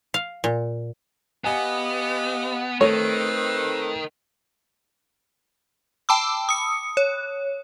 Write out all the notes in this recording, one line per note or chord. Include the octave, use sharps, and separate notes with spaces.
F5
A#2
B3 G4 D#5 F5 G#5
D#3 A3 C4 B4 C#5
G5 A5 B5 D6 E6
D#6 C#7
C#5